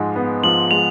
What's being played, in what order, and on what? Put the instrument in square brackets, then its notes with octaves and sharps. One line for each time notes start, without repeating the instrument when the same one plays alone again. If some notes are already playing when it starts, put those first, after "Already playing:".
Already playing: [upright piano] G#2 F3 G#3
B3
[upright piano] F3 [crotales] F#7
[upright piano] G#3 [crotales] F7